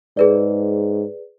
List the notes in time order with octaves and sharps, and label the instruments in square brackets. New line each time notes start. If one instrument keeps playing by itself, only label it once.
[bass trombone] G#2 [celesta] G#4 B4 D5